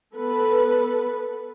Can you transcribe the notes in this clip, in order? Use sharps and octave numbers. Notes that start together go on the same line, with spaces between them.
B3 A4 B4